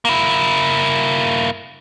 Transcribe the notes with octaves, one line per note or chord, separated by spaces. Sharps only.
A#3 E4